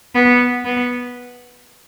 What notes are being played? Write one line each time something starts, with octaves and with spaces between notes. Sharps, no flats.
B3
B3